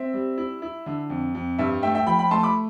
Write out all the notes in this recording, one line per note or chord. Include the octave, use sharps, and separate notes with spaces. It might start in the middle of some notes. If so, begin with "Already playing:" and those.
Already playing: C4 E5
G3
E4
E4
D3
F2
F2
G2 E5
A3 E5 G5
E5 G5
F3 G5 B5
G5 B5
A3 A5 C6
B5 D6